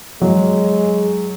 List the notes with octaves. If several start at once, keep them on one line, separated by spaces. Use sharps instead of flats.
F#3 G#3